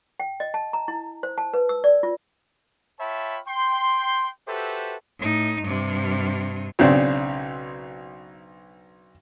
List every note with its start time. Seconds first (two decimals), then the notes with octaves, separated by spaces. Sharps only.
0.20 G5
0.40 D#5
0.54 A5
0.73 A#5
0.88 E4
1.23 C5
1.38 A5
1.54 B4
1.69 E6
1.84 D5
2.03 F4
2.99 F4 C#5 E5 G5 A5 B5
3.48 G5 C6
4.48 F#4 G4 A4 B4 C5 E5
5.19 A2 D#4
5.63 G2 C3
6.79 B1 C#3 C4 D4